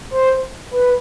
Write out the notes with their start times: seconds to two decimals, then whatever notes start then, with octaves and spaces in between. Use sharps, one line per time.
0.11 C5
0.71 B4